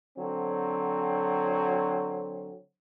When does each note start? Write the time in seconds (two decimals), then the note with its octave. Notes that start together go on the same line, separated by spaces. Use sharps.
0.17 D3 F#3 C4